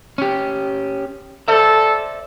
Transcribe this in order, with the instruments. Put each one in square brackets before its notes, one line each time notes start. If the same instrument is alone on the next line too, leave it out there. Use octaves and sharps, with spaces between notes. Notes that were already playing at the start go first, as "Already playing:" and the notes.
[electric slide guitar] C#4 G4
[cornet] A4 [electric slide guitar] C5 D5 E5